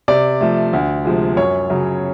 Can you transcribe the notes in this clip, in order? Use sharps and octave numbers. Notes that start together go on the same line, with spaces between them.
C3 D5
F3 A3
D2
C3 F3 G#3
F#2 C#5
C#3 F#3